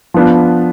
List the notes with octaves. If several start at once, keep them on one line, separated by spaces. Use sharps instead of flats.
F3 B3 D4 F4